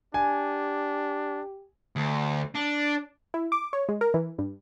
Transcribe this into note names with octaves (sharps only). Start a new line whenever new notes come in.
D4 G4 G#5
D2
D4
E4
D6
C#5
G#3
A#4
E3
G2